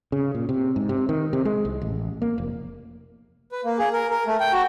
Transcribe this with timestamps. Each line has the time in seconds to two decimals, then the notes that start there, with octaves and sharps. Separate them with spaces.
0.12 C#3
0.35 A#2
0.49 C3
0.76 G#2
0.89 C3
1.09 D#3
1.33 C3
1.45 G#3
1.65 C2
1.82 A1
2.22 A#3
2.38 F1
3.52 B4
3.65 A#3
3.78 G#4
3.93 A#4
4.10 A#4
4.27 A3
4.40 G5
4.52 F#4